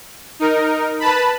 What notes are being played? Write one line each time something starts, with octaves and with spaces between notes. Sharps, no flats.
D#4 A#4
B4 A5 B5